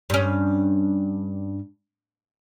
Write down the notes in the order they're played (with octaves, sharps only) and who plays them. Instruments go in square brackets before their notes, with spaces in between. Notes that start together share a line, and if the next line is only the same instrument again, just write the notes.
[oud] G2 C#4